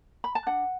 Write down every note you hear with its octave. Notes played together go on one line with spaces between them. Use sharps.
B5
A5
D4 F#5